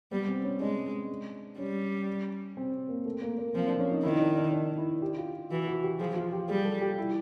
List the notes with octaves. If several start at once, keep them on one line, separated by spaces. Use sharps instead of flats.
G3 B3
C4
C#4
G#3 D4
G3 C#4
C4
A#3
A3
A#3
A#3
F3 C4
D4
C#4
D#4
D#3 E4
D4
D4
D4
E4
G4
F4
E3 F#4
F#4
G4
F3 G#4
F4
G4
G3 G#4
A4
G4
E4